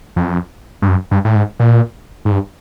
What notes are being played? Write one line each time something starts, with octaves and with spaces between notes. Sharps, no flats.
F2
G2
F#2
G2
A2
G#2
A#2
G#2
G2